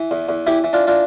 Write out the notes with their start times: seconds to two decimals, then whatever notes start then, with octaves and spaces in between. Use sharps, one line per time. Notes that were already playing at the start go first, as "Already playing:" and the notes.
Already playing: E3
0.11 E2
0.29 E2
0.47 E3 E4 G4
0.64 E3
0.73 D4 F4
0.87 D4 F4